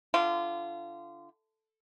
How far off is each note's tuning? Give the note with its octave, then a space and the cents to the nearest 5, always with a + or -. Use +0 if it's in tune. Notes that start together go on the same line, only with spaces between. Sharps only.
D3 +0 F4 -25